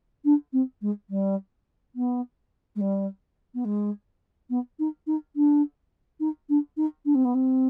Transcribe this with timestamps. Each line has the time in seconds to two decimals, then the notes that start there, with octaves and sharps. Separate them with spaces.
0.24 D4
0.52 C4
0.81 G#3
1.09 G3
1.95 B3
2.75 G#3
2.80 G3
3.54 B3
3.64 G#3
4.49 B3
4.79 D#4
5.06 D#4
5.36 D4
6.20 D#4
6.49 D4
6.77 D#4
7.05 D4
7.14 C4
7.24 B3
7.34 C4